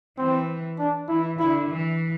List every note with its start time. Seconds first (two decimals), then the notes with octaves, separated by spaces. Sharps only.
0.18 E3 C4
0.79 D4
1.09 E3 E4
1.39 D3 E4
1.70 E3